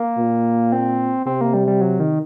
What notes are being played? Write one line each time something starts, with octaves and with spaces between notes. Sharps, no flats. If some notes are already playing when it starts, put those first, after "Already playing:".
Already playing: A#3
A#2
C4
C3 C4
A#3
G3
G3
F#3
D#3